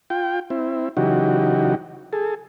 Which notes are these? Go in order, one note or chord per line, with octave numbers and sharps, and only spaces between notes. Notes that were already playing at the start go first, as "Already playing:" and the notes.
F4 G5
C4 E4
C#3 E3 F#3 D#4 F#4 G4
G#4 A4